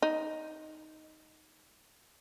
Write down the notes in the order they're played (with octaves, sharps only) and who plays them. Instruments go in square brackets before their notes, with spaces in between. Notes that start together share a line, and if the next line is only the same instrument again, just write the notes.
[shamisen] D#4